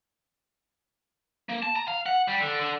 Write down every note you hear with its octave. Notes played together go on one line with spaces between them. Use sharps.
A#3
A5
A#5
F5
F#5
G3
D3
D3